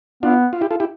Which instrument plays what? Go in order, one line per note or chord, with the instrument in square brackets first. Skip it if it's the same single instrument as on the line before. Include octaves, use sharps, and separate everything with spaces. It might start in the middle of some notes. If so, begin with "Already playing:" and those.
[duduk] B3 [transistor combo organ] D4 F4
[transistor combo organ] F4
E4 G4
F4 A4
E4 G4